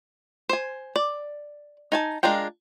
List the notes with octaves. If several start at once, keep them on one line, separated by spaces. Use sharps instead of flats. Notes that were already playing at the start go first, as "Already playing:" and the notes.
C5 G#5
D5
D#4 G#5 A5
G#3 D4 F4 A#4 G5